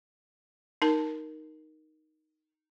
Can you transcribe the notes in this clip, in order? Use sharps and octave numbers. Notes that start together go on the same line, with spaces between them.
D#4 A#4 A5